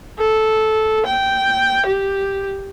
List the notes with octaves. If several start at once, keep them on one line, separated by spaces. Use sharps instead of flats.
A4
G5
G4